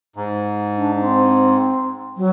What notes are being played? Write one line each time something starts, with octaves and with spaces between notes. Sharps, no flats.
G#2
D4
C4
F#3